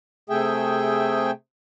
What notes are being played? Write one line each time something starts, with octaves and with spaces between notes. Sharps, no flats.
C3 A3 G#4 E5 G5